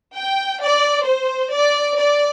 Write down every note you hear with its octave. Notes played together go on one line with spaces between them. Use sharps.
G5
D5
C5
D5
D5